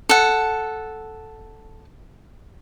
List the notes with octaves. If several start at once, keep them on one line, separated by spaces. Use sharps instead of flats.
A4 F#5